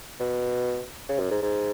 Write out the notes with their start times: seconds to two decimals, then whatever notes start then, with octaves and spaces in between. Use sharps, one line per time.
0.20 B2
1.09 C#3
1.19 F#2
1.31 G#2
1.42 G#2